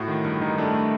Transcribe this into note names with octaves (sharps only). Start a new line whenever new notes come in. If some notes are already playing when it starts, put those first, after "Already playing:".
Already playing: A2 F#4
D#3
G2
D#3 D#4
A3 D4
A3